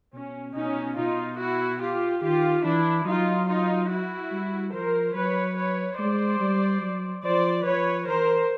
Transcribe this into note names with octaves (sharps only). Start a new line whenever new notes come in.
B2 C#4
B2 C#4 D#4
B2 D#4 F4
E4 F#4
F4 G4
D#3 F4 G4
E3 D4 E4
F#3 D#4 F4
D#4 F4
E4 F#4
G3
F3 A#4 C5
F#3 B4 C#5
B4 C#5
G#3 C5 D5
G3
F#3
F3 C5 D5
F3 B4 C#5
E3 A#4 C5